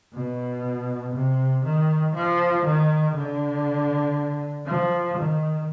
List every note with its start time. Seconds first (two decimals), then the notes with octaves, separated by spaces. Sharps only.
0.14 B2
1.14 C3
1.64 D#3
2.15 F3
2.65 D#3
3.15 D3
4.66 F3
5.17 D#3